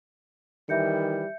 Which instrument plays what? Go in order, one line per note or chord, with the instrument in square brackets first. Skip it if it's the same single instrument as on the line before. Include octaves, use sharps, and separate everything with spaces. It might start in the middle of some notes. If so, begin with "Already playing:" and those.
[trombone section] D#3 E3 G3 [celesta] E5 G6 C#7